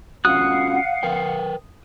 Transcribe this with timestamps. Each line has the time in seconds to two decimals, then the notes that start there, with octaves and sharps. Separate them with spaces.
0.25 C#4 F4 F#4 F5 F#5 D#6 F#6
1.03 A#4 B4 G5